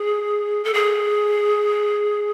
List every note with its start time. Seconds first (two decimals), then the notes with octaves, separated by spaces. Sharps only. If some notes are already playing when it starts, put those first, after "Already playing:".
Already playing: G#4
0.65 A4
0.74 G#4